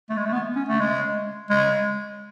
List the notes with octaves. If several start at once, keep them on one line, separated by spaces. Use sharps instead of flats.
A3
G#3
A3
B3
C#4
A3
G#3
G#3